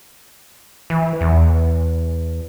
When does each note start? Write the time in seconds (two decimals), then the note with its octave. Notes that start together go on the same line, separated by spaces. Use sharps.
0.90 E3
1.21 E2